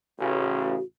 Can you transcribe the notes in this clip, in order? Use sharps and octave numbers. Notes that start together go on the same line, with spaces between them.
A1 C#3 F#4